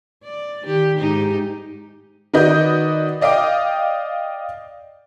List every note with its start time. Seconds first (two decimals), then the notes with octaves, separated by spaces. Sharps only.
0.24 D5
0.63 D#3 G4
0.99 G#2 D#4 G4
2.34 D#3 F#4 B4 D5 D#5 G6
3.21 D5 D#5 F5 G5 D6